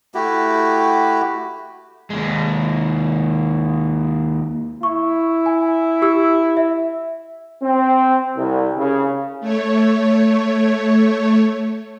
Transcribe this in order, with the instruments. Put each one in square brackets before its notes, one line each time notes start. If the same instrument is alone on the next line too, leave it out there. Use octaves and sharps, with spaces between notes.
[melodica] A3 E4 F#4 G4
[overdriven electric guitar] D#2 G#3
[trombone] E4 [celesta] C#6
[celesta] G#5
G4 E6
E5
[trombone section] C4
C2
C#3
[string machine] A3 C#5